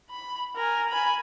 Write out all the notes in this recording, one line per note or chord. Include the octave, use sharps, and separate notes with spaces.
B5
A#4 G#5
G#5 B5